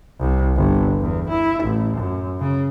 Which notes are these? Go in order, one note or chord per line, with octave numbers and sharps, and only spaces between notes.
C2
G1
E2
E4
A1
F#2
C#3